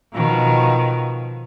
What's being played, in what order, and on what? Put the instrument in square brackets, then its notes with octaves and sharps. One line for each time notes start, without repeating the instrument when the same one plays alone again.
[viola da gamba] B2 D#3 F3